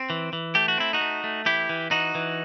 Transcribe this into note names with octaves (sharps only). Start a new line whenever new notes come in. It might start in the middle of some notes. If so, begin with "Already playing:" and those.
Already playing: C4
E3
E3
A3 G4
F#4
C4 E4
D#4 F#4
A3
A3
E3 E4 G4
E3
E3 D#4 F#4
E3